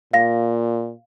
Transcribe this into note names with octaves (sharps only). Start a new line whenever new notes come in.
A#2 F5 A#6